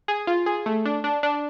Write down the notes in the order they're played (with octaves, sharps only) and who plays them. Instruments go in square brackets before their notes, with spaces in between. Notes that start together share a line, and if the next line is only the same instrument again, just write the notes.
[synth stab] G#4
F4
G#4
A3
D4
D4
D4